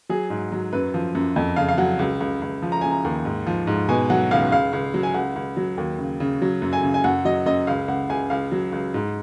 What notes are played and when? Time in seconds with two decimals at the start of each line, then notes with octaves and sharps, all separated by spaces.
0.09 F#3 G#4
0.30 G#2
0.52 F#3
0.73 F#2 B4
0.94 F3
1.15 F#2
1.36 F2
1.56 C#3 F5
1.69 F5
1.78 F#3 F#5
1.99 C#2
2.20 C#2
2.42 C#2
2.62 F3
2.72 A#5
2.81 C#3 G#5
2.91 A#5
3.04 D#2
3.25 G#2
3.47 F3
3.67 G#2
3.89 B2 G#5
4.10 F#3 F#5
4.31 C#2 F5
4.52 C#2 F5
4.73 C#2
4.94 F#3
5.03 G#5
5.14 C#2 F#5
5.36 C#2
5.57 F#3
5.78 D#2
5.99 C#3
6.20 C#3
6.42 F#3
6.62 F#2
6.73 G#5
6.83 C#3
6.94 G#5
7.04 F#2 F#5
7.25 F#3 D#5
7.46 F#2 D#5
7.67 C#2 F5
7.88 C#2 F#5
8.09 C#2 G#5
8.30 C#2 F5
8.52 F#3
8.72 C#2
8.94 G#2